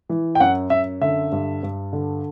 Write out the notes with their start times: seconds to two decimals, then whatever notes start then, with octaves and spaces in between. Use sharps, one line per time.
0.09 E3
0.35 G5
0.40 F#2 F#5
0.70 F#2 E5
1.01 D3 E5
1.32 G2
1.63 G2
1.93 D3